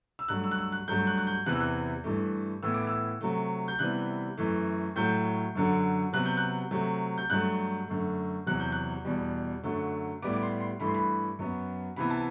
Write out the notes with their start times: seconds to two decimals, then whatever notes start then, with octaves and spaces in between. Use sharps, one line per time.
0.19 E6
0.28 G2 F#3 A3 F#6
0.44 E6
0.51 F#6
0.58 E6
0.72 F#6
0.88 G2 F#3 A3 G6
1.03 G6
1.07 F#6
1.18 F#6
1.27 G6
1.46 E2 C3 E3 B3 F#6
1.53 E6
1.61 F#6
2.04 G2 E3 A3
2.63 A2 E3 B3 E6
2.74 D6
2.87 E6
3.21 C3 F#3 A3
3.68 G6
3.79 C3 E3 G3 B3 F#6
4.38 F#2 E3 A3
4.96 A2 F#3 A3 G6
5.55 F#2 D3 F#3
6.13 C3 F#3 B3 F#6
6.26 G6
6.37 F#6
6.71 C3 F#3 A3
7.18 G6
7.30 G2 F#3 A3 F#6
7.88 F#2 D3 A3
8.46 E2 C3 F#3 F#6
8.60 G6
8.72 F#6
9.05 E2 B2 G3
9.63 F#2 D3 F#3 A3
10.22 A2 G3 B3 D6
10.33 D6
10.42 C6
10.60 C6
10.80 G2 E3 A3 B5
10.87 C6
10.94 B5
11.39 F#2 F#3 B3
11.96 C3 E3 B3 B5
12.10 A5